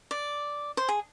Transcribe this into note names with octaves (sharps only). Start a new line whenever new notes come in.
D5
C5
G#4